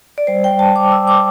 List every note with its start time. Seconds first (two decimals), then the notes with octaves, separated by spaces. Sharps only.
0.18 D5
0.27 G3 C5
0.44 G5
0.51 G3
0.59 A5
0.76 G3 D6
0.92 E6
1.00 G3
1.07 D6